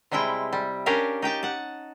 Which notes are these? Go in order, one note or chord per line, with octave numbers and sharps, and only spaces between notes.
C3 G3 G#3 E4 G5
G3
C#4 D4 G4 A#4 F5
D#4 G4 G5 A5
F#5 A5